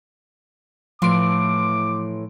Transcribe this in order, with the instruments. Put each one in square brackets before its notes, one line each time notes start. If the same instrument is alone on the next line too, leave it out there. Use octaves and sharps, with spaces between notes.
[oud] A2 E3 [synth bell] F3 C6 D7 [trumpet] D6